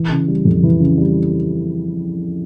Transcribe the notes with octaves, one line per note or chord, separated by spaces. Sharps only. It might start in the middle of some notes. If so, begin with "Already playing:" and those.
Already playing: E3
C#3
G3
F2
E3
C#3
G3